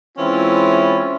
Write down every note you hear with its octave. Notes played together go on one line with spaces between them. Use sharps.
E3 G#3 C4 C#4 E4 F4